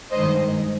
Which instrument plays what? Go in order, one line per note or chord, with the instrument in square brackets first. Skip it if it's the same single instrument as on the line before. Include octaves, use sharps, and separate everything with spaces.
[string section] G2 D#3 G#3 C5 D#5